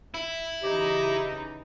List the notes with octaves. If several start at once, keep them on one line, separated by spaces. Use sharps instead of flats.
E4
C#3 E3 D#4 G4